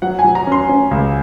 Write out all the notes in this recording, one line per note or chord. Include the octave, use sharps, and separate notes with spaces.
F#3 F#5
G#5
F#3
A#5
C#4 C6
C#4
C#2